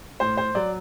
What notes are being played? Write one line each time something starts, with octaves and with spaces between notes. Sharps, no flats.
A2 C5
C5
F#3 D5